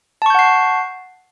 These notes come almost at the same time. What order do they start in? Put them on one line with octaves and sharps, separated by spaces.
A5 C#6 G6 F#5 C7